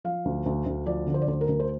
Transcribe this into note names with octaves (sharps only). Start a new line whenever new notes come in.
F3 F5
D2
D2
D2
F3 D5
D3
C5
D5
D2 C5
A#4
D2
C5